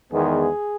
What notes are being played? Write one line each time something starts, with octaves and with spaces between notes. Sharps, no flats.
E2 D#3 G#3 B3 G#4